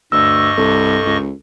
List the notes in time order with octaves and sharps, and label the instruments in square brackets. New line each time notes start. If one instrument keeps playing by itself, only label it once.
[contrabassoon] D2 [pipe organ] G2 D#5 C#6 [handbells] E6
[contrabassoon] C2 [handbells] A4
[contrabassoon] C#2